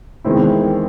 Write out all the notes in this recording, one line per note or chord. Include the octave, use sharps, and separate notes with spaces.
E2 D#3 G#3 C4 E4